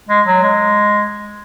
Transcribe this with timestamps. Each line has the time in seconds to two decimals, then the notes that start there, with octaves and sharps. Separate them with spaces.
0.09 G#3
0.27 F#3
0.43 G#3